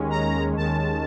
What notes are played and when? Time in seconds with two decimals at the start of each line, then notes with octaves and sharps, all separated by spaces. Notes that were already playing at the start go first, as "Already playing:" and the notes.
Already playing: D#2 D#3 G#3 C#4
0.10 A#5
0.56 D#2 D#3 G#3 C#4 A5